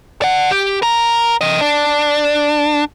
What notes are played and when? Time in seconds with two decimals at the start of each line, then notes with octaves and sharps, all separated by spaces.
0.22 D5 F#5
0.51 G4
0.82 A#4 A#5
1.41 C3 D#5
1.61 D4